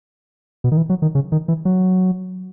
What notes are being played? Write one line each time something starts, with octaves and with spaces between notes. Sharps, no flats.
B2
D#3
E3
F#3
D#3
C#3
D#3
E3
F#3